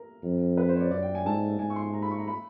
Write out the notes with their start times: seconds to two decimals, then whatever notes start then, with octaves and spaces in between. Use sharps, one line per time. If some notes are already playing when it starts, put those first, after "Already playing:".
Already playing: A#4
0.23 F2
0.57 B4
0.69 C5
0.76 C#5
0.81 D5
0.91 F#2 D5
1.02 G5
1.15 G#5
1.26 G#2 A5
1.59 G#2 G#5
1.70 C#6
1.76 C6
1.93 A#5
2.02 B5
2.11 C#6
2.19 A#5
2.28 B5